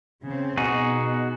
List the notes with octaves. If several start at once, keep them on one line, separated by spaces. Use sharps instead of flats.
C#3 C4
B2 D#4 F#4 G#4